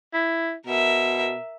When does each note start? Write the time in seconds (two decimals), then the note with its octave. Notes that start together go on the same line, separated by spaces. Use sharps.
0.14 E4
0.67 B2 A#4 E5